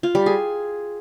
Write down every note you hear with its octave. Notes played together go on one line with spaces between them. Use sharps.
F4
G3
G#4